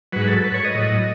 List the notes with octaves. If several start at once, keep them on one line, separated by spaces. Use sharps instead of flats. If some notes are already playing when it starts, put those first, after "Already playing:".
G#2 F#3 B4
A4
B4
C#5
D#5
A2 F#3